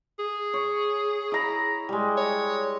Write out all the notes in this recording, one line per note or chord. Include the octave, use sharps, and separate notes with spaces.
G#4
C#5
E4 A#5 B5
G3 G#3
C#5